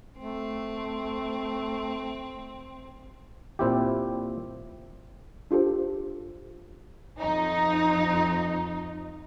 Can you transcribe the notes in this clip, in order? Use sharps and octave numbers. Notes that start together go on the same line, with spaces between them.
A3 C4
A#2 C4 E4 G4
D4 F4 G4 A4 C5
F2 F3 D#4